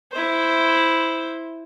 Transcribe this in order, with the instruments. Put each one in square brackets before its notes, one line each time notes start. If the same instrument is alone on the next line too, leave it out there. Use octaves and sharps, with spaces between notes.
[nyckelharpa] E4 C5